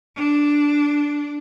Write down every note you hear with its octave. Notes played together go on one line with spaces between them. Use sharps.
D4